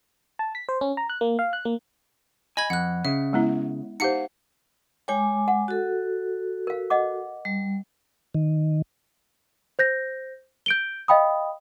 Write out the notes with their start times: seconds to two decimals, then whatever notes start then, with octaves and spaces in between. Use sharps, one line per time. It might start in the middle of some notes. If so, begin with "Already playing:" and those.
0.39 A5
0.55 B6
0.69 C5
0.81 C#4
0.97 A#5
1.10 F#6
1.21 A#3
1.39 F5
1.53 F#6
1.65 A#3
2.57 D#5 G#5 B5 G#6
2.70 F2 F#5 F#6
3.05 C#3 E5
3.33 G#3 B3 E4
4.00 D#4 G4 C5 F5 F#5 C#7
5.08 G#3 C#5 G5 G#5 D6
5.48 F#5
5.68 F#4 A4
6.67 A#4 F5
6.90 D#5 F#5 D6
7.45 G3
8.34 D#3
9.79 C5 G6 A#6
10.66 G6 D7 G7
11.08 D#5 F5 G5 B5 D#6